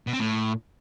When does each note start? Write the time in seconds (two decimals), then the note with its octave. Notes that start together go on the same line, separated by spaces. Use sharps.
0.07 B2
0.13 C4
0.19 A2